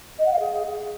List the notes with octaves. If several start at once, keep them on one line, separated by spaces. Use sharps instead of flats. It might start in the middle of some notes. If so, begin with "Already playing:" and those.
D#5
F#5
F5
G#4